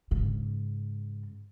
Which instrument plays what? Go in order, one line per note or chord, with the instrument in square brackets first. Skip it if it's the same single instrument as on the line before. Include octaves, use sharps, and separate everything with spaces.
[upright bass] G#2 C#3